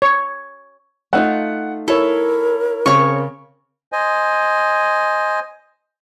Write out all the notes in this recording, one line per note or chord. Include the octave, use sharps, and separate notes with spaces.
C#5
A3 D#4 F4 F#5
E4 A4 A#4 C#5
C#3 C4 C#5 C#6
C5 D#5 G#5